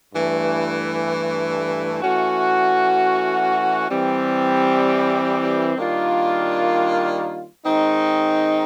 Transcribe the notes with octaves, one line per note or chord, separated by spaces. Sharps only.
G2 E3 A3
E3 A3 C#4 F#4
E3 G3 C4
D#3 G3 A#3 D4 F4
D#3 G#3 C4 D#4